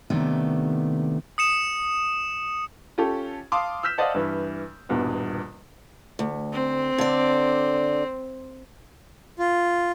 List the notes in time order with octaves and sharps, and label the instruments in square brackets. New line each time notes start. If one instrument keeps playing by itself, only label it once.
[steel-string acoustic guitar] D#2 C3 D#3 A3 B3 D4
[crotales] D#6 C#7 E7
[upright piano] C#4 F4 G4 A4
F5 A5 C6 D6 D#6
E6 F6 G6 B6 E7
C5 D5 D#5 F5 F#5 A5
G2 E3
D#1 E2 G2 B2
[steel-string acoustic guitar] D2
[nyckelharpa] C4
[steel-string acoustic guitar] D3 D5
[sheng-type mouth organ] F4